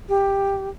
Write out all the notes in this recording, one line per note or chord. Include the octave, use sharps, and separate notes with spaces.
G4